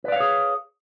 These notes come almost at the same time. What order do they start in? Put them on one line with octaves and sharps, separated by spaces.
B4 D5 F5 C#5 G#4